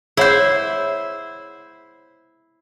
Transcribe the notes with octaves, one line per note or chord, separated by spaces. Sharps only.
E4 G#4 C5 C#5 F#5